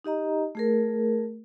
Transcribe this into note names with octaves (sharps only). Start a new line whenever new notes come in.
D#4 G4 D#5 A#5
A3 G#4 A#4